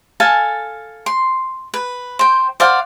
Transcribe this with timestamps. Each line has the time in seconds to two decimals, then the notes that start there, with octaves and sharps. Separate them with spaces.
0.20 A4 F5 G#5 A5
1.06 C6
1.74 B4
2.19 C5 G5
2.60 C5 D5 F5 F#5